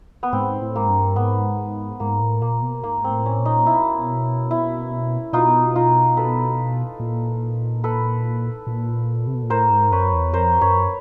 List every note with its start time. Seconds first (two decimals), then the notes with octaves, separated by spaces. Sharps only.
0.23 B3
0.33 G#2 C4
0.62 A2
0.76 G#2 A#3
0.89 G2
1.16 G#2 B3
2.00 G#2 A#3
2.20 A2
2.41 A#2 A#3
2.62 B2
2.84 G#2 A#3
3.04 C4
3.11 A2
3.26 C#4
3.39 A#2
3.45 D#4
3.66 B2 E4
4.51 E4
5.33 B2 D#4 F4
5.76 D#4 F4
6.17 A4 B4
7.00 A#2
7.84 A4 B4
8.67 A#2
9.27 C3
9.35 B2
9.43 A#2
9.50 A2 A#4 C5
9.71 G#2
9.92 F#2 B4 C#5
10.13 E2
10.33 F2 A#4 C5
10.61 F#2 B4 C#5